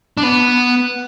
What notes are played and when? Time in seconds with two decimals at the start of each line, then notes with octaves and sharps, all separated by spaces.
0.17 D4
0.23 B3